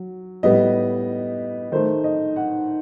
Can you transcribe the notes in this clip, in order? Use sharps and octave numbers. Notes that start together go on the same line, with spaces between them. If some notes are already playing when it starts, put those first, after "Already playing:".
Already playing: F#3
A2 G3 B3 D#5
D#3 A3 C5
D#5
F#5